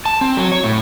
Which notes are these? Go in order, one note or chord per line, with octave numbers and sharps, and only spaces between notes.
A5
C4
F#3
C#5
A2